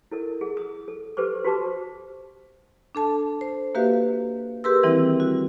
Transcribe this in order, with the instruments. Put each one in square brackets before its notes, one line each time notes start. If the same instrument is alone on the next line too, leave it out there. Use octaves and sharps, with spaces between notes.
[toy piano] E4 A4 A#4
G#4
D#6
A4
G4 A4 B4 C5 D6
F#4 G4 B4 C5 A5 D6
[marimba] D4 A4 A5
C5
A#3 F#4 G4 B4 E5 F5
G4 G#4 A#4 B4 C6 E6
D#3 E3 G3 C4 E4
F#4